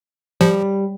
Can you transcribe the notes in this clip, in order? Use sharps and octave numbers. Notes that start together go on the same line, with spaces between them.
F3 G3